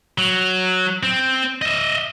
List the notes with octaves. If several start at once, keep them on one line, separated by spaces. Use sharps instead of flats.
F#3
C4
D#5 E5